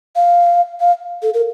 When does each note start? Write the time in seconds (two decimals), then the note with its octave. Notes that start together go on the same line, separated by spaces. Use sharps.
0.16 F5
0.80 F5
1.23 A4
1.34 A#4